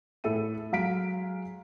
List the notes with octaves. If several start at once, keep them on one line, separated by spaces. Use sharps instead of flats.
A2 A4 E5 D#7
F#3 G#3 F5 A#5 B6 D7